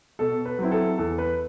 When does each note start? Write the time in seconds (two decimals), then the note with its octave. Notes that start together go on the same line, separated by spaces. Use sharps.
0.19 B2 A4
0.45 B4
0.59 F#3 C4 E4
0.72 A4
0.98 E2 A4
1.18 B4